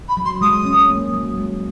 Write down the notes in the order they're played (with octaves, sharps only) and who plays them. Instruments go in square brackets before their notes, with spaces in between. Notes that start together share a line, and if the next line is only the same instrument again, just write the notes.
[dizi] B5
[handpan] F#3
[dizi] C6
[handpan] G#3 [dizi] D#6
[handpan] C#4
A#3
F#3
G#3